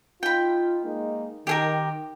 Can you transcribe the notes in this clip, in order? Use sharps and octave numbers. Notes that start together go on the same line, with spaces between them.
D#4 F4 G5 B5
G#3 A#3 D#4
D#3 G4 G#4 A#4